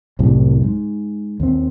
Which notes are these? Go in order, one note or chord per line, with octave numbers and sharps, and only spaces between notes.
C2 F#2 A2 C3
G#2
D#2 C4